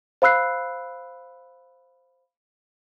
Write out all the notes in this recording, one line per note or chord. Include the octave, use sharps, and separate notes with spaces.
C5 F5 B5 E6 F#6 C7